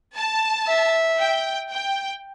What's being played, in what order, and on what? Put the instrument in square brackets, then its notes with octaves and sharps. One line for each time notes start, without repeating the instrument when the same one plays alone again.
[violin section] A5
[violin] E5
[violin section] G5
G5